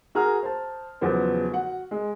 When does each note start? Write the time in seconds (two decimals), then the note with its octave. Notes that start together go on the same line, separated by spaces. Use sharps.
0.15 F#4 G#4 A#4 A#5 F6
0.43 C5 A5
1.01 E2 C#3 F3 F#3 B3 C5
1.52 F#4 F#5
1.91 G#3